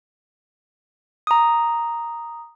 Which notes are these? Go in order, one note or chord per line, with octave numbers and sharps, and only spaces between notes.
A#5 D#6